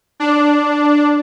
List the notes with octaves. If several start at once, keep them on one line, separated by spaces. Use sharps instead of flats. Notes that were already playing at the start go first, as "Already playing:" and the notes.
D4